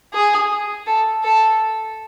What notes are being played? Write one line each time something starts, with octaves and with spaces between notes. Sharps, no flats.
G#4
A4
A4